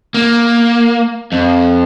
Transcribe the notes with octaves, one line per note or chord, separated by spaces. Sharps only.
A#3
F2